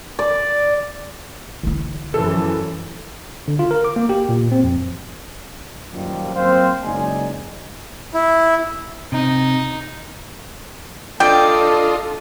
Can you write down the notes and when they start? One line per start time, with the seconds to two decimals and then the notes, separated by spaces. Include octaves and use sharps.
0.19 D5
1.63 D3 E4
2.14 F#2 E3 F3 A4
3.48 D3
3.59 F4
3.71 A#4
3.85 D6
3.96 A#3
4.09 G4
4.29 A#2
4.52 C4
4.64 F2
5.92 F#2 A#2 D#3 F3 G3
6.35 F#3 A#3 C4 C5 F5
6.83 F#1 G#3 D#4 D5 G#5
8.14 E4
9.12 C3 D#4
11.20 D4 F4 A4 D5 D#5 G5